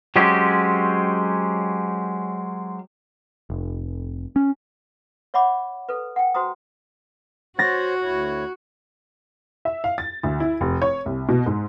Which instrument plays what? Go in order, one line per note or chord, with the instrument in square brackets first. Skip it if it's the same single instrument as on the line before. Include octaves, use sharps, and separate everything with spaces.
[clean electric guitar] F#3 G#3 C4 C#4 G4
[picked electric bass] F1
C#4
[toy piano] C#5 E5 F#5 B5 D6
A4 B4
F#5 G5
F#4 C5 A#5 D#6
[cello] F#4 [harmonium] C5 C#5 F#5 [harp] A6 A#6
[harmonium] D2 E4 C#5
[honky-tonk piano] E5
F5
A6
D2
E4
F1
C#5
C2
B2
G#2